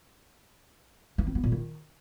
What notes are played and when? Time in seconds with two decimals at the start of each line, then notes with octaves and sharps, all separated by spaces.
1.18 E3
1.27 C4
1.35 B3
1.44 A#2
1.52 D#3